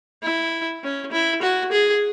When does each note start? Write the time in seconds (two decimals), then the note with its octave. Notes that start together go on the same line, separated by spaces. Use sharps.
0.23 E4
0.84 C#4
1.12 E4
1.42 F#4
1.72 G#4